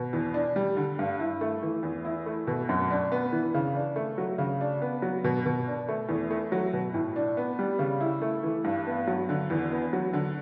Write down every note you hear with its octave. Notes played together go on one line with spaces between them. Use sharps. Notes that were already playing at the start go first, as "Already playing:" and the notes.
Already playing: B2
E2
D4
G3
D3
G2
E4
A3
E3
E2
E4
A3
B2
F#2
D4
B3
E3
C#3
D4
A3
F#3
C#3
D4
B3
F#3
B2
B2
D4
A3
E2
A3
F#3
B2
A2
D4
B3
G3
C#3
E4
A3
E3
G2
B3
F#3
D3
E2
B3
F#3
D3